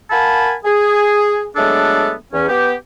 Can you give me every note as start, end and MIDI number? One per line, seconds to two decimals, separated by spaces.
0.11 0.52 70
0.11 0.52 77
0.11 0.52 78
0.11 0.52 80
0.11 0.52 81
0.11 0.52 83
0.65 1.46 68
1.56 2.11 54
1.56 2.11 56
1.56 2.11 57
1.56 2.11 59
1.56 2.11 62
1.56 2.11 69
2.32 2.48 40
2.32 2.48 61
2.48 2.73 59
2.48 2.73 67